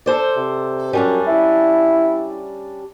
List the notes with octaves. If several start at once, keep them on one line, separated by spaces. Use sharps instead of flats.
A4 C5 D5
C3
F#2 G3 C#4 D4
E4